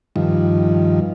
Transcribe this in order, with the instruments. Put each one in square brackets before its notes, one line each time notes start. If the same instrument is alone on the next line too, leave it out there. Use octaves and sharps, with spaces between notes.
[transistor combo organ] G2 D#3 F3